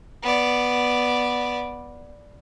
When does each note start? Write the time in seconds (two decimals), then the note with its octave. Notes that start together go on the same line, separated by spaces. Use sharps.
0.23 B3 D5